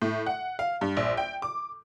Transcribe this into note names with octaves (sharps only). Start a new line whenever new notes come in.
A2
F#5
F5
G2
A#1
G5
D6